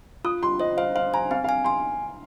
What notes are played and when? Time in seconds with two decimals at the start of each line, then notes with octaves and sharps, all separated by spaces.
0.25 F4 D#6
0.43 F4 C6
0.60 C5 D#5
0.77 C5 F5
0.95 C5 F5
1.14 G#5 A#5
1.31 C4 F5
1.44 F5
1.49 G#5
1.64 G#5 C6